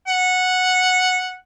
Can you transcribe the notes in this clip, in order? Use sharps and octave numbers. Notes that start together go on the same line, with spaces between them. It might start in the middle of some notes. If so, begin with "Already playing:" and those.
F#5